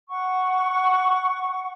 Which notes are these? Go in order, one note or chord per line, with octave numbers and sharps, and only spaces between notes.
F#5 C#6